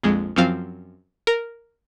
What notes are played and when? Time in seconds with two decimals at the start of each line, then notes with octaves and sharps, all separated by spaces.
0.03 A#1 F2 G#3
0.36 F#2 F3 C4 F5
1.27 A#4